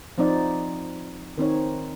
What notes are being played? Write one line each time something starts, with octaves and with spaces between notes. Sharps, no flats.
F3 C4 D#4 D5
D#3 C4 D#4 C#5